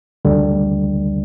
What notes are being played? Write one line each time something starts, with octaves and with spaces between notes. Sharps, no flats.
D2 D3 G3